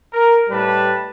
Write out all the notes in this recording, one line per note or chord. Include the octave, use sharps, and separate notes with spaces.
A#4
A2 G3 B4 A5